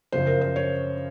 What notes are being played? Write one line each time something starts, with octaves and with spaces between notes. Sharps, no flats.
F#2 C#3 F3 C5
A#4
C5
C#5